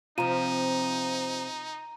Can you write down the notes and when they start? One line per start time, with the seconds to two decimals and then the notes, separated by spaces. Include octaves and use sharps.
0.18 C3 F3 D#4 F4 A#5 D#7